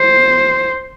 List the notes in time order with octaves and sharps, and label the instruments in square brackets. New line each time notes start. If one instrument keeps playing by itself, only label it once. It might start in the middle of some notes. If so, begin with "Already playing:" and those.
Already playing: [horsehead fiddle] C5